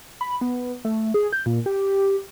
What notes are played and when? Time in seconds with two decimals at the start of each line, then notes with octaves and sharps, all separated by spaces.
0.21 B5
0.41 B3
0.85 A3
1.14 G#4
1.33 G6
1.46 A#2
1.66 G4